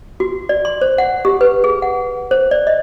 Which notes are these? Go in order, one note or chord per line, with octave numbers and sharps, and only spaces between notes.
F#4
D5
C6
C5
F#5
G4
B4
G#4
F#5
C5
D5
D#5